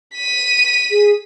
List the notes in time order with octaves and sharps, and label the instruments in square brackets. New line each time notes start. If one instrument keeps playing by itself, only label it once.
[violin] B6 D#7
[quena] G#4